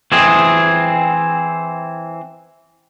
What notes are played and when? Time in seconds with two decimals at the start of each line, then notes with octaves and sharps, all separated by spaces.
0.12 E3 C4 G#4